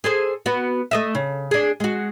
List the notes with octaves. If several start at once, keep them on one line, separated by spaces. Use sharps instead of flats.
G#4 A4 C5
B3 F#4
A3 D#5 E5
C#3
D4 G#4
G#3 F#4